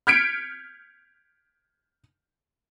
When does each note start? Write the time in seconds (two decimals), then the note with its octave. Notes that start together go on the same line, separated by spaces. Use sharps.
0.07 F6 G6 G#6 B6 C#7 D7